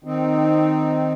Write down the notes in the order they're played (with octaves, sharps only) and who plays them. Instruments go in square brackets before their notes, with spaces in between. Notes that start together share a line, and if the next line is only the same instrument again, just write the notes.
[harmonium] D#3 C4 D#4